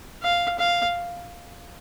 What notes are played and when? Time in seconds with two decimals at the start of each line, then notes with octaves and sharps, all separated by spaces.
0.22 F5
0.59 F5